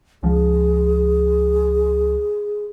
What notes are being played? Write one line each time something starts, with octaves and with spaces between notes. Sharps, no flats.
C#2 F3 G#4